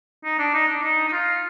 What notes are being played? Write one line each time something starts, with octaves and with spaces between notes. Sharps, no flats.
D#4
D4
D#4
D4
D#4
D#4
F4